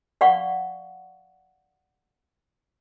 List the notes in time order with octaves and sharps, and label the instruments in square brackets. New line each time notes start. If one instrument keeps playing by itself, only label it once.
[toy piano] D5 F5 F#5 C#6